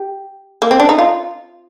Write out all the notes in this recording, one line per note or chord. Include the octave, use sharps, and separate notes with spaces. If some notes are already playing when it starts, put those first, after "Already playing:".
Already playing: G4
A#3
C4
D4
D#4
F4